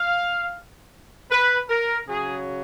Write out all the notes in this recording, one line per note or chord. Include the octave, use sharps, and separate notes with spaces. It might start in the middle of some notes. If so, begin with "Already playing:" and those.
Already playing: F5
B4
A#4
C#3 F#3 G#4